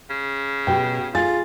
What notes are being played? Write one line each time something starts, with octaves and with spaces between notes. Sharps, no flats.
C#3
B2 F#4 G4 G5
F4 G#4 A6